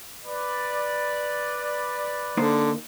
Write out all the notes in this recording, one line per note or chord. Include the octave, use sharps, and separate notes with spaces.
B4 D5
D3 A#3 D#4 C5